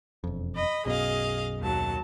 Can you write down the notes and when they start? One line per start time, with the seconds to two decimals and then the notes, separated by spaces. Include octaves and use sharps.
0.24 E1 F2
0.55 D#5 B5
0.86 B1 F#2 B2 G#4 D#5 F5
1.59 D#2 F#3 A5